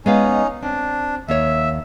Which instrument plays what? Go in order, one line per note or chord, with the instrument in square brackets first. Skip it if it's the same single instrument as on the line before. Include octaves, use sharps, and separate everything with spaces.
[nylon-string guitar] G#3 B3 F5 [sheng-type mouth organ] C#4 D#4
[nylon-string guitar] C4 [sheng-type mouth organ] D4
[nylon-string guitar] D#2 A#3 C#5 [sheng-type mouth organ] E5